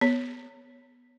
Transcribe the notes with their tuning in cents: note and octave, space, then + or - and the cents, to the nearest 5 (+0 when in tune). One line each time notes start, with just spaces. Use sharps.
B3 +0 C#5 +0